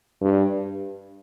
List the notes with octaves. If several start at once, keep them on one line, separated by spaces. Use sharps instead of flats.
G2